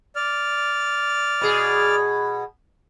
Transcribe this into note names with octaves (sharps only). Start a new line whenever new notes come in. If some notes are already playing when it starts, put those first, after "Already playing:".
D5 F6
B2 G#4